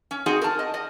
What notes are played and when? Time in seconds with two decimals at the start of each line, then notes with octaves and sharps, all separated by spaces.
0.11 C#4
0.26 C4 D#4 F#4 G#4
0.41 A#4 A5
0.59 D#5
0.74 D#5